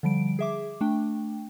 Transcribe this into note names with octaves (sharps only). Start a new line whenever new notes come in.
D3 F3 G3 D7
G#4 E5 D6
A3 D4 G5